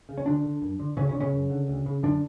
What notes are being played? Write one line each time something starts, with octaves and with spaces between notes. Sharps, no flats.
C#3
C#4
D2 D3 D4
D3
F#2
D3
D2 C#3 C#4
C#3 C#4
D3
C#3 C#4
F#2
D3
D2
C#3
F#2 D3 D4